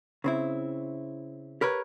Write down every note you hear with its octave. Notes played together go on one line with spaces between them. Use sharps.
C#3 C4 E4
G4 A#4 B4 C#5